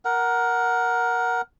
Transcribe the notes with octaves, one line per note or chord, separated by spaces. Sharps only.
A#4 F#5